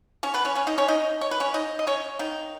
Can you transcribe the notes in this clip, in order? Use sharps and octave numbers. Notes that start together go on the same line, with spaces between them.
C#4 C#5
B3 B4
C#4 C#5
C#4 C#5
D#4 D#5
C#4 C#5
D#4 D#5
C#5
B4
C#4 C#5
D#4 D#5
D#5
C#4 C#5
D#3 D#4